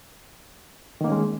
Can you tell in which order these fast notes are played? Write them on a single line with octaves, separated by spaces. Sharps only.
D#3 A#3 C#4 G#3